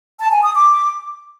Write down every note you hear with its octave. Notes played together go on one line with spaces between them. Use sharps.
A5
G#5
D#6
D6